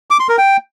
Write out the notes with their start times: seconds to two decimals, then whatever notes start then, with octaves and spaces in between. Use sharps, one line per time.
0.10 D6
0.20 C6
0.29 A#4
0.38 G5